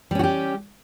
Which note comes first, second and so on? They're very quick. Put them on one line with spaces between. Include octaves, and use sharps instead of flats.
G3 C#4 F#4 G4